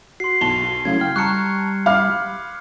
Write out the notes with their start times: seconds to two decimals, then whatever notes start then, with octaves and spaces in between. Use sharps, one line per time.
0.20 F#4 C6 C7
0.41 B1 A5 F7 G7
0.85 C#3 F#3 A3 C#4 E4 F5 G#6
1.01 G5 F6
1.16 G3 A5 A#5 C#6 F#6 C#7
1.86 F5 B5 D6 F6